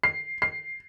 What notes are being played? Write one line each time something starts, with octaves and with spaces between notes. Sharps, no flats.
C7
C7